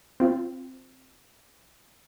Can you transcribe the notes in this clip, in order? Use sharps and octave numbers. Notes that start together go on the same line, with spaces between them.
C4 F4